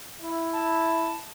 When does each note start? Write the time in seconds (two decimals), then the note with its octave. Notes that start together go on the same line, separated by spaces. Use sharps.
0.21 E4
0.53 A5